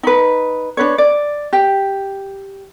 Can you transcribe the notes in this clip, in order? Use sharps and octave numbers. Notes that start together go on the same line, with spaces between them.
D#4 B4
D4 B4 C#5
D5
G4